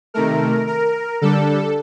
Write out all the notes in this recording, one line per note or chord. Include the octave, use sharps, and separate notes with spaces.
C3 D#3 A3 A#4
A#4
D3 G3 D4 A4